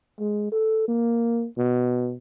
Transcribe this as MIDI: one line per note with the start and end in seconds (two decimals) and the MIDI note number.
0.20 0.50 56
0.52 0.85 69
0.88 1.46 58
1.58 2.16 47